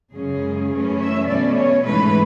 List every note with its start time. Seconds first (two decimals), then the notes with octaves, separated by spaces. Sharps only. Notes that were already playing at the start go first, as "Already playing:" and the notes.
0.14 F#2 C#3 G#3 C#4 G#4
0.72 F#2 E3 A3 C#4
1.01 E5
1.29 B2 A3 C#4 D5
1.58 C#5
1.87 G#2 E3 A3 B4